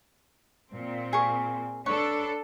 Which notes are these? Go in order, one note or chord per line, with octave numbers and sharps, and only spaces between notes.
A#2 C4
G#4 A#4 C#6
D4 A4 B4 C#5